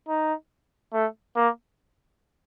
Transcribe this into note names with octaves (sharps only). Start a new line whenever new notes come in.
D#4
A3
A#3